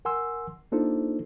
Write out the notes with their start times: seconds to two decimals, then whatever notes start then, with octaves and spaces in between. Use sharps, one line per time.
0.05 A#4 F#5 G#5 C6 E6
0.72 A#3 D4 D#4 F4 A4 C5